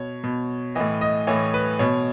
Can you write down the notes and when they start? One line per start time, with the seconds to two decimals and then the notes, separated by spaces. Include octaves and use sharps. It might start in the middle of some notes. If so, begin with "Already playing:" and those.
Already playing: B2 C#5
0.24 B2
0.75 A2 E3 D#5
1.01 D#5
1.27 A2 E3 C#5
1.54 B4
1.79 B2 C#5